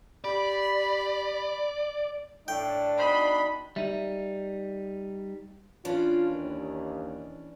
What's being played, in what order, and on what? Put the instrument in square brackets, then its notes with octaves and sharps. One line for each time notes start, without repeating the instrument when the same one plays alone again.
[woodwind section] G4 B5 [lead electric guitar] D5
[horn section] A2 [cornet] D4 [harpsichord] G5
[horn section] B2 D#4 C6 [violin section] B5
[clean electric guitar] G3 D#4 [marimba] E5
[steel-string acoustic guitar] E3 C#4 D4 [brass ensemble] F4
[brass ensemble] D#2